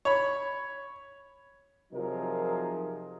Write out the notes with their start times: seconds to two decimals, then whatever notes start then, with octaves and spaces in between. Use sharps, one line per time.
0.05 C#5 B5
1.93 C3 F3 F#3 D#4 G#4 A#4